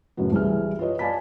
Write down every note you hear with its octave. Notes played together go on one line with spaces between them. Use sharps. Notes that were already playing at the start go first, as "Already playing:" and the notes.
F#2 A2 C#3 F#3 B3
C2 E3 G#4 F6
F4 G4 B4 C#5 D#5
D5 F5 G#5 A5 B5 B6